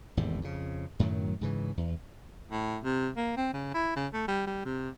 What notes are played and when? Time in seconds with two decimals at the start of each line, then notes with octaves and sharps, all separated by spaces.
0.17 G#1 E2 A2 C3
0.41 F2 C#3
0.99 F#2 A2 D#3 F#3
1.41 G#2 C#3 E3
1.77 E2
2.52 A2
2.84 C3
3.17 A#3
3.37 C4
3.53 C#3
3.74 E4
3.96 C#3
4.13 A3
4.28 G3
4.47 G3
4.65 C3